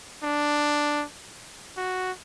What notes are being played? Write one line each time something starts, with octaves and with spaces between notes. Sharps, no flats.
D4
F#4